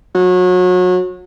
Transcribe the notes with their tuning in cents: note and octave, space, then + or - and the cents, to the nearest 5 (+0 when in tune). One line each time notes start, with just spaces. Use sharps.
F#3 -30